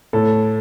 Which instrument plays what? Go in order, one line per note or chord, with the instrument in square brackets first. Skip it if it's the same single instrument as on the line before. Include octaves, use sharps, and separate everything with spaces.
[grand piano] A2 A4